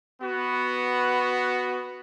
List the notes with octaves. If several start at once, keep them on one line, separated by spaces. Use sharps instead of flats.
B3 F#4